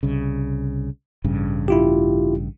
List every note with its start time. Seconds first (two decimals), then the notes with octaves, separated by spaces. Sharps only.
0.03 C2 C#3
1.24 A1 G2 C#3
1.68 E4 F4 G4